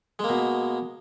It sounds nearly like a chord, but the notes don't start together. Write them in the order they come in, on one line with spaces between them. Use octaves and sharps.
G#3 A#3 B2